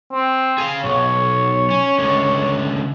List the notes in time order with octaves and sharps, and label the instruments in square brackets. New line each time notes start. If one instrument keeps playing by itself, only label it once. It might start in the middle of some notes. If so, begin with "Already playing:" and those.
[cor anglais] C4
[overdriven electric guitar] G#4 F5
[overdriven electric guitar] B1 [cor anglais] C#5
[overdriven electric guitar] C#4
C#2 D3